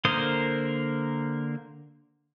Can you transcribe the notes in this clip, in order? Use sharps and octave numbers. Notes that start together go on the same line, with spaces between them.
D3 A#3 A#4 C5 D#6